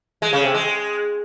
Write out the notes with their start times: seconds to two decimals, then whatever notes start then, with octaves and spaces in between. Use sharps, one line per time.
0.22 G#3
0.33 C#3
0.44 C3
0.54 G#3